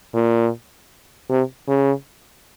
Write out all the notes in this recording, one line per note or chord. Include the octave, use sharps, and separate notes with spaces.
A#2
C3
C#3